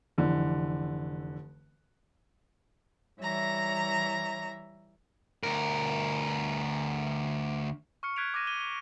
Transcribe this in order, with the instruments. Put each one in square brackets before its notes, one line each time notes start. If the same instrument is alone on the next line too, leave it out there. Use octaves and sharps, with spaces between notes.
[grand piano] F1 D3 E3
[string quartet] E3 G3 C#5 E5 A#5 A#6
[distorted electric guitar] D2 A#4
[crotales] C#6 F6 C#7
F6 F#6 G#6 B6 D7 F7
D6 G#6 A#6 D#7
D#7 G7
G7